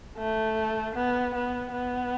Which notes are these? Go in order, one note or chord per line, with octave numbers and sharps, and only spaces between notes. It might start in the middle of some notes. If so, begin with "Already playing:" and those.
A3
B3
B3
B3